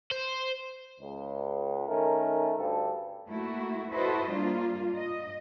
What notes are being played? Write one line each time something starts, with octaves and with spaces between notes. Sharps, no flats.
C5
C#2
D#3 A3 C#4 A#4
D2 G2 A4
A3 A#3 E4 F#4
E4 F#4 A4 B4 C5 D#5
G3 A#3 D4 F4
D#5